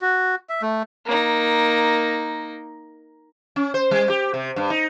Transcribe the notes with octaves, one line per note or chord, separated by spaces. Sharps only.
F#4
E5
A3
A#3 D#4
C#4
C5
G3
G4
C3
G2
D#4